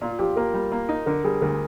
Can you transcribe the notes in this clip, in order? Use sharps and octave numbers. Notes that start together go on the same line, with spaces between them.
A#2 F4
F3 G4
A#3 A#4
G3
A#3
D#4
D3 A#4
G3 G#4
D2 A#4